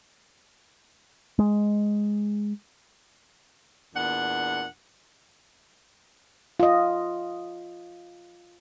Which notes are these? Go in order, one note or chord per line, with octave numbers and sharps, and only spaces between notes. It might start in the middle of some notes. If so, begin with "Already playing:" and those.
G#3
E2 A#2 D4 F#5
F4 D#5